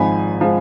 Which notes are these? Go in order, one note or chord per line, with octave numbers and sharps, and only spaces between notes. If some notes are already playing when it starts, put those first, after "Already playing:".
Already playing: G#1 G#2 F3 G#3 G#5 B5
F3 G#3